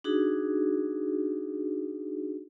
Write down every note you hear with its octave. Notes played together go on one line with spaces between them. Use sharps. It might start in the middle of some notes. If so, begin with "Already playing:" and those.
D4 D#4 F#4 G#4